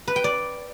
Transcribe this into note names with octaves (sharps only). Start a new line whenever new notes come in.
B4
G5
D5